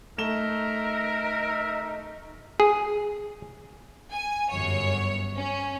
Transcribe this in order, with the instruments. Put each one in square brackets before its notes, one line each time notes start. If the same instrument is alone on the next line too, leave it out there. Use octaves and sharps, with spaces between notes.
[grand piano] A3 E7 G7 [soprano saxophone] D#4 [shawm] A#4 [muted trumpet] E5
[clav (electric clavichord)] G#4
[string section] G#5
G1 F#2 C#5
C#4